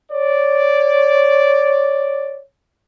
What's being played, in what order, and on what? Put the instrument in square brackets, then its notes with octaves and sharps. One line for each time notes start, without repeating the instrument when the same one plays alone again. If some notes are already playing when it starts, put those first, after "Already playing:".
[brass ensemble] C#5 D5